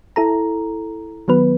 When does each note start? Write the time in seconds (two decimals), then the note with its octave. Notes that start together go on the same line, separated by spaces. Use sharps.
0.16 E4 A4 A#5
1.28 D#3 F#3 B3 B4